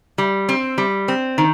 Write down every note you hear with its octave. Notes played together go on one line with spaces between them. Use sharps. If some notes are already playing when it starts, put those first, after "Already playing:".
G3
C4
G3
C4
D#3